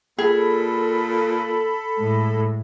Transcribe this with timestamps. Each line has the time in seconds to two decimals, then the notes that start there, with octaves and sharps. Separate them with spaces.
0.18 A#2 G#4 A4 B5
1.97 A2 G#3